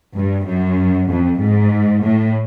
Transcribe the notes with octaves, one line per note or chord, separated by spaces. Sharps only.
G2
F#2
F2
G#2
A2